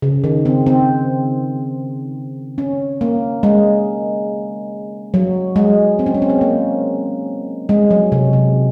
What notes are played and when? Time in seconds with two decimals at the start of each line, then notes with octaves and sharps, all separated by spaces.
0.02 C#3
0.24 D#3
0.45 C4
0.67 C4
2.58 C#4
3.01 A#3
3.43 G#3
5.14 F#3
5.56 G#3
5.99 C4
6.06 C#4
6.14 C4
6.22 C#4
6.30 C4
6.41 A#3
7.69 G#3
7.91 F#3
8.12 C3
8.33 C3